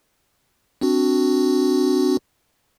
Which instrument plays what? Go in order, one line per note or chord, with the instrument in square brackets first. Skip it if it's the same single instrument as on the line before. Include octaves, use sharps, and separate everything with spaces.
[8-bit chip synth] C4 D4 F#4